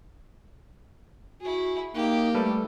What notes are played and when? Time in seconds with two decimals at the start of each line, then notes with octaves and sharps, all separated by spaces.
1.41 E4 F#4 G#4
1.95 A#3 D#4 G4
2.35 G3 A3 A4 B4